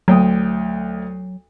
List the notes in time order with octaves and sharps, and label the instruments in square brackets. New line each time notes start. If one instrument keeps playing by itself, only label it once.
[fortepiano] D2 G5 D#6 [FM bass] F#3